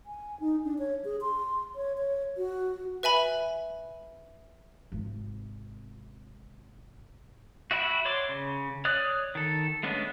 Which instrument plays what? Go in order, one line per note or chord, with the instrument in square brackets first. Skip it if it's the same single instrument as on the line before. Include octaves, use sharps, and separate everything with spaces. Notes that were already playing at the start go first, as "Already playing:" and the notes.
[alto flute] G#5
D#4
D4
C#5
G#4
C6
C#5
C#5
F#4
[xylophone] B4 E5 G#5 B5
[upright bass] G#1 C3
[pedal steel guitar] F#4 E5 G5 B5
C#5 D5 C6 D6
C#3
C#5 D5 D#6 F6 F#6
D#3 A4
G#3 A3 B3 C#4 D4